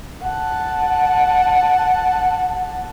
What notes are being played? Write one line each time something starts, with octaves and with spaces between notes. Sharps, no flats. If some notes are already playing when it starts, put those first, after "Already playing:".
F#5 A5